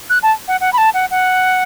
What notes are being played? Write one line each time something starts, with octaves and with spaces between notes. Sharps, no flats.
F#6
A5
F#5
F#5
B5
A5
F#5
F#5